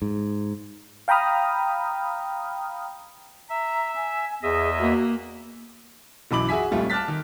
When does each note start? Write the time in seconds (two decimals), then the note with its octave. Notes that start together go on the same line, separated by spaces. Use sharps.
0.02 G#2
1.08 F5 G5 A#5 B5 D#6 F6
3.49 E5 A#5
3.96 G#5
4.43 E2 G#4 D#5 E5
4.79 A#3 F#4
6.31 B1 F#2 E3 B5 D6 F#7
6.49 F#4 G#4 E5 G#5 B6
6.71 D#1 F2 G3 A3 F4
6.90 A5 D6 F6 F#6 A6 B6
7.08 D#3